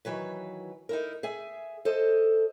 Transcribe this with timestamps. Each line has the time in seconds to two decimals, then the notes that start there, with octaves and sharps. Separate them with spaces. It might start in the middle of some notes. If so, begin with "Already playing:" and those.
0.05 D#3 E3 F#3 B4
0.89 D#4 E4 A#4
1.23 G#4 E5 G#5
1.85 A4 C5 D#5